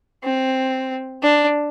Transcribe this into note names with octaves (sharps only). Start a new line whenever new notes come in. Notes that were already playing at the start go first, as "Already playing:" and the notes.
C4
D4